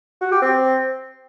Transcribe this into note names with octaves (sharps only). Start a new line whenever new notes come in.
F#4
G4
C4